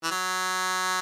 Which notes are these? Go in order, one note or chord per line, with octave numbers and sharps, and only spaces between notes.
E3
F#3